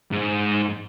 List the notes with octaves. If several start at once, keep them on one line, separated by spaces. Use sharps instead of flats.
G#2